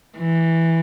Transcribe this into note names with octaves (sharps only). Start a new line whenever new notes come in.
E3